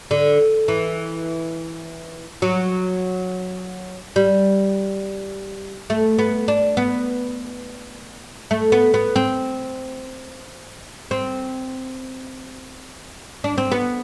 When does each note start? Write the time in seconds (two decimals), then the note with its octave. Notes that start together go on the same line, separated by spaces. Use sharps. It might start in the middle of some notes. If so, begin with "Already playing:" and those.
0.11 D3
0.68 E3
2.42 F#3
4.16 G3
5.90 A3
6.19 B3
6.48 D4
6.77 B3
8.51 A3
8.72 B3
8.94 B3
9.16 C4
11.11 C4
13.44 D4
13.58 C4
13.72 B3